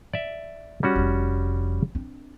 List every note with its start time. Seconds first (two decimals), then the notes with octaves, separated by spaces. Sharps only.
0.13 D5 E5
0.83 G3 C#4 F#4
0.96 F1 F2
1.95 C4 D4